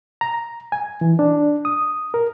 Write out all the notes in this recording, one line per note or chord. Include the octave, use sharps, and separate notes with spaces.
A#5
G#5
E3
D4
D#6
A#4